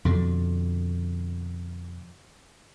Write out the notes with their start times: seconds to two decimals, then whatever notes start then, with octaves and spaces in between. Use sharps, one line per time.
0.05 F2 B2 D3